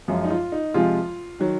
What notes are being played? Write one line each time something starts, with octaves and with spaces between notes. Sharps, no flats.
F#2 F3 G#3
D#4
F4
D#4
C3 F3 G#3 F4
D#3 F#3